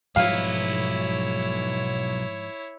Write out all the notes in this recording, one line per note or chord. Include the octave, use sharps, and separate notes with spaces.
B1 G#2 F3 G3 E4 B4 C#5 F5